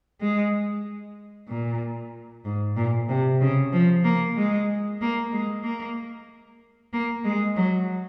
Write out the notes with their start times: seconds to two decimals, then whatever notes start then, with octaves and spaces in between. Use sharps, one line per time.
0.22 G#3
1.49 A#2
2.45 G#2
2.77 A#2
3.09 C3
3.41 C#3
3.73 F3
4.05 A#3
4.36 G#3
5.01 A#3
5.33 G#3
5.64 A#3
6.93 A#3
7.25 G#3
7.56 F#3